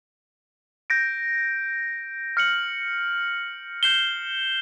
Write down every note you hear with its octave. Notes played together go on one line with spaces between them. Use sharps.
G6 A#6 D7
F6 A#6 C#7 F#7
G6 C7 E7 G7